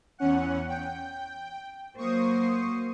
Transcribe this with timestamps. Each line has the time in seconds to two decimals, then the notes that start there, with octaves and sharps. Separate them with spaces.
0.18 E2 C#4 F#5
0.68 G5
1.97 F#3 A#3 C5 C#6 D#6